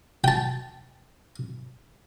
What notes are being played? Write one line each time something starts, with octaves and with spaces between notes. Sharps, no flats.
G5 A5